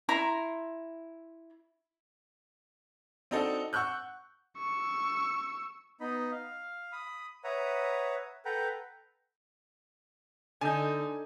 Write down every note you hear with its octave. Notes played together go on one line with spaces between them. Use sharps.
E4 A#5 C6
C4 D4 D#4 F#4 A4
F#5 C#6 E6 F#6 G6
C#6 E6
B3 D#4 D#5 B5
F5
B5 D#6
B4 C#5 E5 F#5 A#5 D#6
A4 B4 F#5 G5 A#5
D3 D#4 A4 G#5 G6